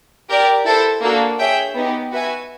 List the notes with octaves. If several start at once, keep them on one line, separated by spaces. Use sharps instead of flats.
G4 A#4 D5
E4 A4 C5
A#3 D4 F#4 A4
G#4 C#5 E5 G5
B3 D#4 G4
F#4 B4 E5 G#5